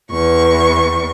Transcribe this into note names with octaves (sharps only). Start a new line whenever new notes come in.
E2 C#6